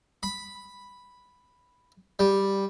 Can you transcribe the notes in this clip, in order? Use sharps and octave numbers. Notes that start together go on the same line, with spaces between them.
B5
G3